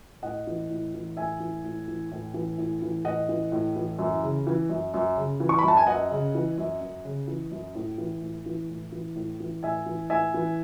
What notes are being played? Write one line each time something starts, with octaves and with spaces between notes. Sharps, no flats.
A2 D#5 F#5
E3
A2
E3
A2 E5 G#5
E3
A2
E3
A2
E3
A2
E3
A2 D#5 F#5
E3
A2
E3
F#2
C#3
E3
F#2
F#2
C#3
E3
C#6
B5
F#2 A5
G#5
F#2 D#5 F#5
C#3
E3
F#2
F#2
C#3
E3
F#2
A2
E3
A2
E3
A2
E3
A2
E3
A2 E5 G#5
E3
A2 E5 G#5
E3